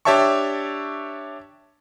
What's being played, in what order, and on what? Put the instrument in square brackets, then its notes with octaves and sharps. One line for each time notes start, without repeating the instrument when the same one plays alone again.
[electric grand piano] D4 G4 C#5 E5 A5 C#6